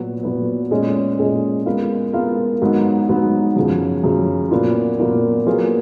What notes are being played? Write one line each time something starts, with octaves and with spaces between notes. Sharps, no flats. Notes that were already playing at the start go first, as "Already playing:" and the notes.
Already playing: A#2 F#3 B3 F#4 B4
A#2 F#3 B3 F#4 B4
A#2 G#3 C#4 G#4 D#5
A#2 G#3 C#4 G#4 D#5
G#3 B3 F4 A#4 F5
G#3 B3 F4 A#4 F5
G#2 F#3 B3 D#4
G#2 F#3 B3 D#4
F#2 C#3 F3
F#2 C#3 F3
A#2 F#3 B3 F4 A#4
A#2 F#3 B3 F4 A#4
F#3 A#3 F4 G#4 B4